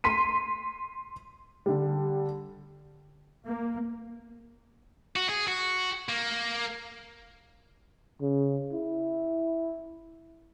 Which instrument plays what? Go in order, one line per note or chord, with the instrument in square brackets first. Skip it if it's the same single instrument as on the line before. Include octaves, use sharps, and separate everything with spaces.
[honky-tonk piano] C6 B6 D#7
D3 G3
[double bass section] A#3
[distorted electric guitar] F#4
G#4
F#4
A#3
[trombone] C#3
E4